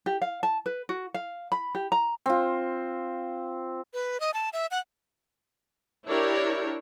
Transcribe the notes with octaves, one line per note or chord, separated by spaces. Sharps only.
G4
F5
A5
B4
F#4
F5
B5
G4
A#5
C4 F4
B4
D#5
A5
E5
F#5
D4 E4 G4 A#4 C#5